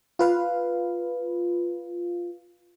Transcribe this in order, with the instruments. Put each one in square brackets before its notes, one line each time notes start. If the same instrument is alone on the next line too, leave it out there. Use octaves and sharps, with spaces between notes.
[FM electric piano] F4 B4 F5